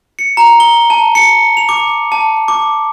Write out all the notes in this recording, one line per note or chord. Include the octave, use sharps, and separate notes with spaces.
C#7
A#5
G7
A5
C#7
F7
D6
A5
D6